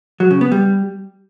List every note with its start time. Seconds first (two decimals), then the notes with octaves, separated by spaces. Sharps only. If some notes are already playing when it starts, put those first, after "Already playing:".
0.20 F#3
0.31 C#3
0.41 B3
0.52 G3